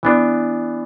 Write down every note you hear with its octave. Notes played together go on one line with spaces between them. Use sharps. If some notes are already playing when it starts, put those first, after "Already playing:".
E3 B3 D4